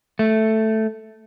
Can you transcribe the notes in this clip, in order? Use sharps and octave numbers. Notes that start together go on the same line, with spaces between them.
A3